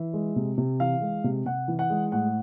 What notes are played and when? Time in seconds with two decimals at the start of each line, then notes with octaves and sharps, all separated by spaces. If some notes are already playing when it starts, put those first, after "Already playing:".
Already playing: E3 E5
0.13 G#3
0.36 C3
0.58 C3
0.80 E3 F5
1.01 G#3
1.24 C3
1.46 C3 F#5
1.68 E3
1.79 F#5
1.90 G#3
2.12 A2 F#5